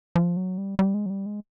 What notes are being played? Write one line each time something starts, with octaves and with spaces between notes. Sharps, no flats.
F3
F#3
G3
G3
G#3
F#3
G3
G#3